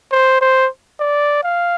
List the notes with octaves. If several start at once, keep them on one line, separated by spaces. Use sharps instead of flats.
C5
C5
D5
F5